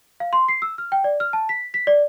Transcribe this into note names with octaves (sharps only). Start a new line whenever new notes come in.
F5
C6
C7
E6
F6
G5
D5
F6
A5
B6
B6
D5